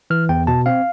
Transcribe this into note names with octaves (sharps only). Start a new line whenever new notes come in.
E3 F6
E2 G5
B2 A5
C4 F5